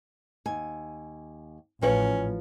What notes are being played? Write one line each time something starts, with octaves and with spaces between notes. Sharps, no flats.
D#2 G#5
A1 F3 C#4 B4 C#5